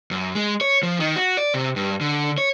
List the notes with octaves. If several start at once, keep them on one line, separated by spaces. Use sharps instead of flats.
F#2
G#3
C#5
F3
D#3
F#4
D5
C3
G2
D3
C#5